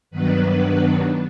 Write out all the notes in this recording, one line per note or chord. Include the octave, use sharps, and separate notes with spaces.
G2 D#3 F#3 B3 D4 B4